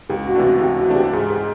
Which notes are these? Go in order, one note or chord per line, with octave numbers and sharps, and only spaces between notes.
C#2 G4
F#4
C3 E3 A3 D4
F#4
C#2 G4
F#4
C3 E3 A3 D4
G4
G#2 G#4
G4